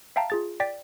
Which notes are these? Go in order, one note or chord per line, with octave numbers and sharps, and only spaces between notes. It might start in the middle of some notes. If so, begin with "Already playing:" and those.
E5 F5 G5 A5 A#5
F4 G#4 A6
D5 G5 A6 B6